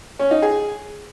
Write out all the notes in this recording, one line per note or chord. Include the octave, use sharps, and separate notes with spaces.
C#4
D#4
G#4